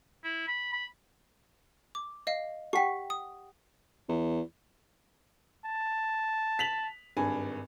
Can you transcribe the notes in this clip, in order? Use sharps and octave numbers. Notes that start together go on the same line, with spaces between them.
E4
B5
B5
D6
D#5 F5
G4 F#5 G5 C#6 B6
D#6
E2
A5
B6 F7 F#7
G#1 G2 G#5